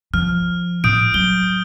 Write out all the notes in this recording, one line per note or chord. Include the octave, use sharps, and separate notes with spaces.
F3 F6
A2 D#6 G6 D7
F#3 G7